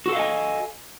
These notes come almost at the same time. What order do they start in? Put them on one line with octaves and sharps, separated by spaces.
F#4 A4 F5 D#5 G#5